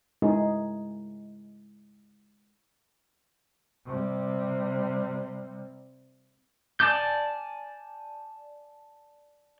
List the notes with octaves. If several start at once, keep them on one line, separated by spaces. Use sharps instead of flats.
G#3 C#4 D#4 E4 G#4
C3 G3
D5 G#5 A5 D6 G6